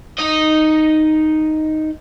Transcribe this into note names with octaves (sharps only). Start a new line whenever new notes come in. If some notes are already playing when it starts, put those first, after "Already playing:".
D#4 D#5